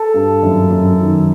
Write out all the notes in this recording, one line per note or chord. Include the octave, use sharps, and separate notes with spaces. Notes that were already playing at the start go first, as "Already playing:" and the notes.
Already playing: A4
G2
F#2
F#2
D#3